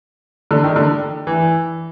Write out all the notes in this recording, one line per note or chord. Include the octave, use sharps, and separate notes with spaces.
D3
D#3
D3
E3